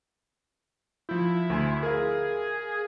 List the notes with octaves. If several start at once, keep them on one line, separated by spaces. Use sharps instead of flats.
F3 E4 G6
D2 G#5 C6
G#4 A#4 F5